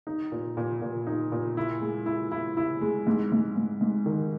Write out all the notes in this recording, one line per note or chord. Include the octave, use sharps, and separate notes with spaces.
D#4
A#2
A#2
A#2
D#4
A#2
E4
G#3
E4
E4
E4
G#3
G#2
G#2
G#2
G#2
D#3